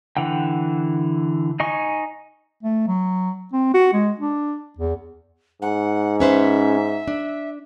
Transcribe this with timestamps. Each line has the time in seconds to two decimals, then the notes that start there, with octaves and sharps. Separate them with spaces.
0.17 D3 E3 F#5 G5
1.60 D#4 D#5 G#5 C#6
2.63 A3
2.87 F#3
3.53 C4
3.74 F#4
3.93 G#3
4.19 D4
4.78 E2
5.62 G#2 F#5
6.20 C#4 B4 C5 E5
7.08 D4